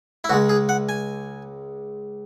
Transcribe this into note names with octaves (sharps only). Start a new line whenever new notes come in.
E4
C#2 C#3 G#3 F#4
G#4
F#5
G#5